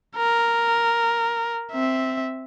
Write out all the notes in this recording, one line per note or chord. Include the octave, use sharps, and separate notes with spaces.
A#4
C4 E5